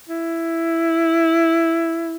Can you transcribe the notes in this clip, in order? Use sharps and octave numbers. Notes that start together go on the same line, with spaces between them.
E4